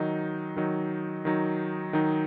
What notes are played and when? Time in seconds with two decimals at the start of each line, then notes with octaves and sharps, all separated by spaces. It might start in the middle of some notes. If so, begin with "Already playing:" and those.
Already playing: D#3 F#3 D#4
0.56 D#3 F#3 D#4
1.25 D#3 F#3 D#4
1.93 D#3 F#3 D#4